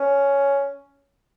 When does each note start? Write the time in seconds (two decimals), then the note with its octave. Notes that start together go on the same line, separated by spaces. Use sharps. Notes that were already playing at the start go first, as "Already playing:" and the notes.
Already playing: C#4